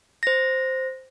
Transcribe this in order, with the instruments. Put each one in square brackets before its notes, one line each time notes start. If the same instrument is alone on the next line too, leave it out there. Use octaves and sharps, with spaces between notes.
[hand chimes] C5 A#6